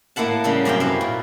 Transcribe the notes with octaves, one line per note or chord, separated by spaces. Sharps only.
A2 A#3 E4 F#5 A5
C#3 G3 A#3 A4
F#2 C3 F#4 F5 G5
E4 B4 F5
A#2